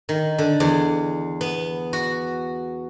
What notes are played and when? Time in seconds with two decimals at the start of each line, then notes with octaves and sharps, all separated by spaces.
0.09 D#3
0.38 D3
0.60 E2
1.41 B3
1.93 F#4